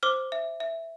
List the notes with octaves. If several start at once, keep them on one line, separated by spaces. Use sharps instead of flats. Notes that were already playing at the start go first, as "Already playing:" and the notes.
C5 D6 F6
E5
E5